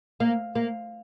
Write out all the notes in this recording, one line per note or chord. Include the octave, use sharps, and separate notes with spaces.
A#3
A#3